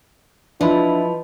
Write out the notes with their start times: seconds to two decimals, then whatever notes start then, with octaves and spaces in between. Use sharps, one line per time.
0.61 F3 D4 E4 B4 D#5 B5